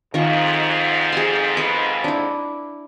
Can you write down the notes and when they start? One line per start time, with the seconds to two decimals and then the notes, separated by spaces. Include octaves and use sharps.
0.14 F2 G#2 D#3 F4 C#6
1.12 G#4 C6
1.57 B4 G5
2.04 D4 E4